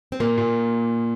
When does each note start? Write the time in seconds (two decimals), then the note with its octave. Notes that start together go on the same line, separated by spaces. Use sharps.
0.12 C4
0.20 A#2 A#3
0.38 A#2